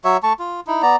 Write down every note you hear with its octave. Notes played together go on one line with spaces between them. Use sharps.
F#3 F#4 C#5 E5
A3 A5 C#6
F4
D#4 E4
B3 D5 A#5